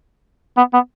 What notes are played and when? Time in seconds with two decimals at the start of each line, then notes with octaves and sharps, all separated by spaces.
0.57 B3
0.74 B3